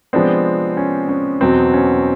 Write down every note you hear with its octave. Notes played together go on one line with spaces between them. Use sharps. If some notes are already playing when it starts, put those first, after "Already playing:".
C3 F3 G#3 B3 C4 D4
C#4
C#4
E2 B2 F#3 C4
C#4